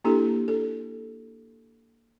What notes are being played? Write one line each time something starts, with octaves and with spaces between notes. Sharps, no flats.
A#3 D4 E4 G4 A4
A4